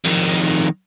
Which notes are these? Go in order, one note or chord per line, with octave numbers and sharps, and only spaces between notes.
F2 D#3